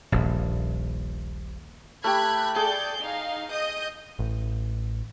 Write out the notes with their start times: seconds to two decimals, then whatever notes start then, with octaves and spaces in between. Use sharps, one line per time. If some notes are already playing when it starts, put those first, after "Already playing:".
0.12 D#1 A#1
2.04 A3 G4 B5 F#6 G#6
2.56 G#4 A4 D5 G6
3.01 D#4 F5
3.52 D#5 D#6 G6
4.19 A1